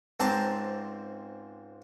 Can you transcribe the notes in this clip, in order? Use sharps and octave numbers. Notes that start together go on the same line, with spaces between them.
C#2 G#2 C4 G4 A5 A#5